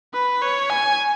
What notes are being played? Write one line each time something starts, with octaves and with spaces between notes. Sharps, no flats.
B4
C#5
G#5